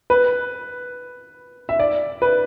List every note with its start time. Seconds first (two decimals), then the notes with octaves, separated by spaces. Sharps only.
0.10 B4
1.69 E5
1.80 D5
2.22 B4